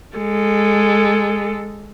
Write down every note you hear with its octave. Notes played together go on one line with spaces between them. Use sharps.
G#3 A4